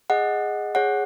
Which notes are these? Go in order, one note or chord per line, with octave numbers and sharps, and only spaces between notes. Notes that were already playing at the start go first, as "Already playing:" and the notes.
G#4 D#5 F#5
G#4 C#5 F#5